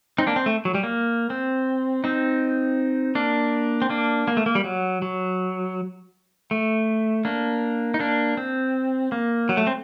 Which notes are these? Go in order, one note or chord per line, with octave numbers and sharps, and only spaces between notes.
C4 D#4
A#3 D4
C4
A3
F#3
G3
A#3
C4
C4 D#4
A#3 D4
C4
A#3 D4
A#3
A3
A#3
G3
F#3
F#3
A3
A#3 D4
D#4
A#3 D4
C4
A#3
F#3
A3
C4